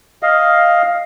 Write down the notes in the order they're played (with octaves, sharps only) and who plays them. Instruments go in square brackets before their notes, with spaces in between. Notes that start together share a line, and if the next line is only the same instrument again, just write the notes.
[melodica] D#5 F5